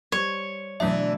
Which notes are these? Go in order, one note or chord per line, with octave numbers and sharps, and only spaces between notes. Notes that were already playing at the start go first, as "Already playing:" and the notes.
G3 C5 C#5
B2 D3 E3 F#3 A3 D4 E5